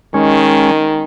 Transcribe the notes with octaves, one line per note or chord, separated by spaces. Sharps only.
D#3 G#3 C#4